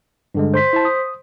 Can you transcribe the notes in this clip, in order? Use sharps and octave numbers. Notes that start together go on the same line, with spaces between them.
G2 D3 G#3
C5 C6 B6
E4 A5
D#6